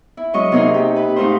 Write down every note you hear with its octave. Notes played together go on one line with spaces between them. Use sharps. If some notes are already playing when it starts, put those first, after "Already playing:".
E4
F#3 G#3 C#4 D#5 C#6
C3 A#3 D#4 G#4
G4
B4
G#2 A3 D#4 F4 B4 C5